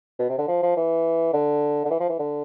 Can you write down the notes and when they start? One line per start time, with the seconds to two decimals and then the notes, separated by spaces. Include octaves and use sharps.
0.19 B2
0.29 C3
0.38 D3
0.48 F3
0.62 F3
0.77 E3
1.33 D3
1.85 D3
1.90 E3
2.00 F3
2.09 E3
2.19 D3